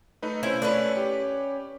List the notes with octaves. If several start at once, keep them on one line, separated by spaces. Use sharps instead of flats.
A3 D#4 B4
C#4 E4 C5
A3 C#4 B4 D5
G4